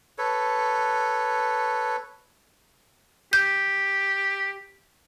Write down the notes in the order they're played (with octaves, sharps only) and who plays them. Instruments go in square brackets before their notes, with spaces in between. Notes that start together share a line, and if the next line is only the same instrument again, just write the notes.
[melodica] A4 B4 C#5
[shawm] G4 [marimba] G6